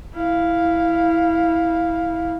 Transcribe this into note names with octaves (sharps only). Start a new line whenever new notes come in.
E4 F5